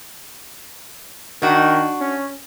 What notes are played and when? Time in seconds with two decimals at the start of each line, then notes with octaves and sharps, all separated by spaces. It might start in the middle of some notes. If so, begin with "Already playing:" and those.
1.42 D#3 D4 F#4
2.01 C#4